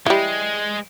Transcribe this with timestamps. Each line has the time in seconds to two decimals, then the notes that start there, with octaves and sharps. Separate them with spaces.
0.06 E3 G3 G#3